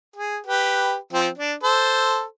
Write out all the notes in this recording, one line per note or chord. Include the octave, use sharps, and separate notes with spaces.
G#4
G4 B4
F3 C4
D4
A4 C5